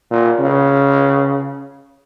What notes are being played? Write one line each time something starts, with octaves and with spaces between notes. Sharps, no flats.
A#2
C#3